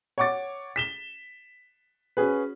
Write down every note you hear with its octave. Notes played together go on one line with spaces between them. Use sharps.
C#5 F#5 C#6 D6 A6
B6 E7 G7
C#4 F#4 G#4 B4